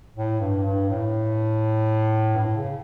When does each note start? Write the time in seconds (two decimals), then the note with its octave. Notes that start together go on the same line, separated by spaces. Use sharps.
0.16 A2
0.40 G2
0.65 G2
0.89 A2
2.34 G2
2.38 A2
2.57 C#3